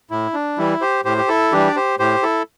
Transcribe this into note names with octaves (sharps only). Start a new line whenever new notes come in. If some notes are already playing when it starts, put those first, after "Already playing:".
A2 E4
D4
E3 G3 E4
G4 C5
A2 G4 C5
G4
E4 A4
E3 G3 D4 G4
D5
G4 C5
A2 G4 C5
E4 A4